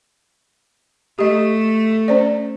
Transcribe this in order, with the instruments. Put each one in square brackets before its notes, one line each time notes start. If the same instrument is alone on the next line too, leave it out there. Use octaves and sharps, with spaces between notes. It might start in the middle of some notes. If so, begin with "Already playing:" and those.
[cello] A3 [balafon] G4 D#5
[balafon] C#4 C5 D5